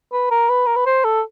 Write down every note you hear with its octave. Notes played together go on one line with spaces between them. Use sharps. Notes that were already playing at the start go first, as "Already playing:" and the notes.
B4
A#4
B4
A#4
B4
C5
A4